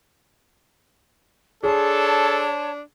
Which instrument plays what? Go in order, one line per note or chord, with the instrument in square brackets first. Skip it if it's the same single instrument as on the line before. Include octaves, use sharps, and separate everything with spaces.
[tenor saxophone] D4 [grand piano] G#4 [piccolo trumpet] A4 [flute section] C#5 A5 C6